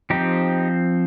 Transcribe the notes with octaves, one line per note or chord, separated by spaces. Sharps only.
F3 C4 D#4 G4